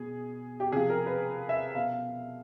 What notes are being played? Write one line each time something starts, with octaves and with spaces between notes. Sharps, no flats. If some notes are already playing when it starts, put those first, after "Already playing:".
Already playing: B2 G#4
G4
C3 F3 G#4
A#4
B4
E5
B2 F5